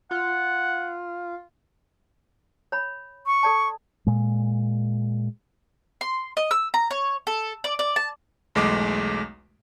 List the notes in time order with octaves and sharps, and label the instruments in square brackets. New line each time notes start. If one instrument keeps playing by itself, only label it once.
[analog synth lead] F4 [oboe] F#5
[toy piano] C#5 B5
[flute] C#6
[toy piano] A4 D5 A5
[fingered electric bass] A#2 G#3
[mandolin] C6
D#5
E6
A#5
C#5
A4
D5
D5
A5
[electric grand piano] B1 E2 G#3 A3 D6